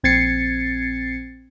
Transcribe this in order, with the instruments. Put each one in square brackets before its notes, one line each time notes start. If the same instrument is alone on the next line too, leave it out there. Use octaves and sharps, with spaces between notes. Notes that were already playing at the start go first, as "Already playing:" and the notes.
[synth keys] A#1 C4 G#6 A6 C7 C#7